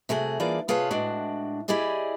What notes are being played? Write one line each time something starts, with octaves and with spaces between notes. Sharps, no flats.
C3 A3 F#4 G#4
E3 A#3 D4 F4 G#4 D5
C3 F4 G#4 B4 C#5 A5
A2 G#3 D4 F#4
E4 G4 G#4 D5 D#5